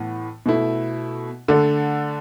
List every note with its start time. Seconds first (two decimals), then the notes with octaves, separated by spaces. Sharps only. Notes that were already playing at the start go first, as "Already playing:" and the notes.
Already playing: A2 E3 B3
0.46 B2 A3 E4
1.48 D3 A3 D4 A4